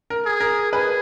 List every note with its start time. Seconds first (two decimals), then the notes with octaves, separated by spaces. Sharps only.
0.10 A#4
0.25 G#4
0.40 A#4
0.72 G#4 B4